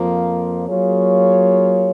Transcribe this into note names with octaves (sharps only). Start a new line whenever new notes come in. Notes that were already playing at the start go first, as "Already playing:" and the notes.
Already playing: F2 F3 A#3 F4
F#3 A#3 F4 G#4 C#5